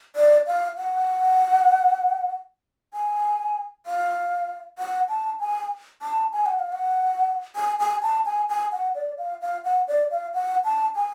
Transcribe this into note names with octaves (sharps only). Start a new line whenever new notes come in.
D5
F5
F#5
G#5
F5
F#5
A5
G#5
A5
G#5
F#5
F5
F#5
G#5
G#5
A5
G#5
G#5
F#5
D5
F5
F5
F#5
D5
F5
F#5
A5
G#5